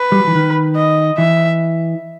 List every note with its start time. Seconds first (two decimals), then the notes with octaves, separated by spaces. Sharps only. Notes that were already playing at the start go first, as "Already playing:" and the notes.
Already playing: B4
0.12 G3
0.20 F#3
0.27 E3
0.35 D#3
0.76 D#5
1.18 E3 E5